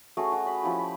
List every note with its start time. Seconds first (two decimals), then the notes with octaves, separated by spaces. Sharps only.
0.17 A3 C#4 F#4 G#4
0.32 F#4
0.47 B5
0.63 F3 C#4 E4 G4
0.79 B5